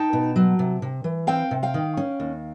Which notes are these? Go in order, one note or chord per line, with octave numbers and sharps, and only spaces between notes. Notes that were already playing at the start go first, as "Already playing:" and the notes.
Already playing: D#4 G5 A5
B2
F#3
C3
C3
E3
C4 F5 G5
C3
F5 G5
D#3
C#4
D#2